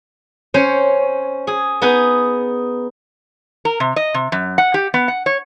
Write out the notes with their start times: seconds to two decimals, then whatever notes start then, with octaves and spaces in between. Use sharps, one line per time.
0.54 C#4 C5 C#5
1.47 G#4
1.82 B3 D#4 G#4 B4
3.65 A#4
3.80 C3
3.96 D#5
4.14 C3
4.32 F#2
4.58 F#5
4.74 G4
4.94 B3
5.08 F#5
5.26 C#5